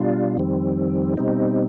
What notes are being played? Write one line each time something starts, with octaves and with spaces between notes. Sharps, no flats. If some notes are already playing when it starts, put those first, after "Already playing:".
Already playing: B2 G3 D4 F4
F2 D#3 G3 C4
B2 G3 C4 D#4